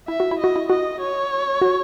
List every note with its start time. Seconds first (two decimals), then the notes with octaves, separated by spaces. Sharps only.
0.08 E4 E5
0.20 F#4
0.31 E4
0.39 F#4 D#5
0.56 E4
0.70 F#4 D#5
1.00 C#5
1.62 F#4